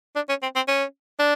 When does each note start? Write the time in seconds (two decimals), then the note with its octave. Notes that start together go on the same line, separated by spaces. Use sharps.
0.15 D4
0.29 C#4
0.42 C4
0.56 C4
0.68 C#4
1.19 D4